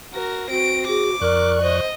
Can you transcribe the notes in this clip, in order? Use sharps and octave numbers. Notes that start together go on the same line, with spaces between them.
F#4 A#4 A#6
C4 F#4 D7
F#4 G#4 D6
F2 A#4 D5 C#6 F#6
C5 D#5